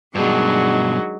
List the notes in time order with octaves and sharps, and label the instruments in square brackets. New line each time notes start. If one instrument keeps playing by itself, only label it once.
[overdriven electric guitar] G2 B2 [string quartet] D#3 F#3 [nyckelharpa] G#3 D4